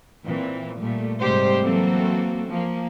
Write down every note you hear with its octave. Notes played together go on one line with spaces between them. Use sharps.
A#2 E3 C4
A#2 G3 A3
G#2 C3 G3 A3 G4 C5
E3 F#3 A#3 C4 F#4 A4
F3 A#3